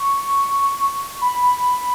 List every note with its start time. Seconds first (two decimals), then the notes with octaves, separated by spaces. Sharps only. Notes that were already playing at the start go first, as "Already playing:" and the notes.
Already playing: C#6
1.21 B5